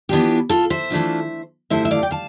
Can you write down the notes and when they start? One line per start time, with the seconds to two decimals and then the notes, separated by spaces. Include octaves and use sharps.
0.09 E3 B3 D4 F4 G4
0.49 F4 A4
0.70 C5 E5
0.90 E3 A3 D4 F4
1.70 G2 D3 F3 A3 E4 C5 E5
1.85 E5
1.91 D5 F5
2.03 G5
2.11 F5 A5